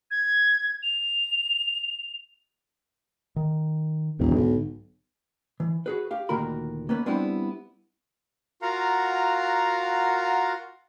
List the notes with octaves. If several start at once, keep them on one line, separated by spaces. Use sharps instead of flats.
G#6
F7
D#3
E1 A1 D#2 F#3
B1 G#2 D3
E3
F#4 G#4 B4
G4 F5
D2 A#2 D#3 F#4 A#4 B5
A#3 B3 C#4 B4
G3 B3 C4 D4 E4 G4
F4 F#4 A#4 F5 F#5 A#5